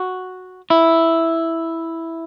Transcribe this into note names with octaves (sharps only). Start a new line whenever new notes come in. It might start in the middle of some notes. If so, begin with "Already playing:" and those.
Already playing: F#4
E4